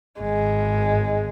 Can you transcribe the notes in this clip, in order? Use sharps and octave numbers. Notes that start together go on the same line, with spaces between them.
G#1 G#3